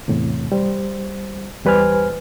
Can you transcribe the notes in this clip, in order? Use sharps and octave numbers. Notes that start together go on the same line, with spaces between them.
E2 A2 C3
G3 C5
E2 G3 B4 C5 G#5 F6